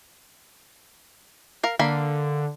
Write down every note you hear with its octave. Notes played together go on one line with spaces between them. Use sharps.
A#4 F5
D3 A#3 F5 B5